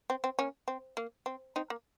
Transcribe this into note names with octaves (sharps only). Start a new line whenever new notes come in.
C4
C4
A#3 C#4
C4
A#3
C4
C4 D#4
A#3